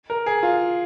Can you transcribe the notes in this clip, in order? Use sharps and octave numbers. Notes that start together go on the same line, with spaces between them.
A#4
G#4
F4